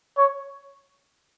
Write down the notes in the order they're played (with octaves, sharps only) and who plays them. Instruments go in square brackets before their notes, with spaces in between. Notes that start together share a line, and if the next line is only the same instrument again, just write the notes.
[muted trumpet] C#5